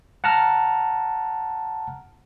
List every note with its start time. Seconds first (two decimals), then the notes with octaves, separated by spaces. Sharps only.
0.24 F#5 A5 A#5 F6